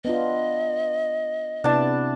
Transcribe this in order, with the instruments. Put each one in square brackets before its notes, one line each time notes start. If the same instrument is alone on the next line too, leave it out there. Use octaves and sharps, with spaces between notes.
[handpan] B3 D4 F4 [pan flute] D#5
[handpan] C3 B3 E4 [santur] D4 A5